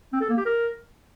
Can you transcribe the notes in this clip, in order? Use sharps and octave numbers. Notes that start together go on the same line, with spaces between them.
C4
A4
A#3
G4
A#4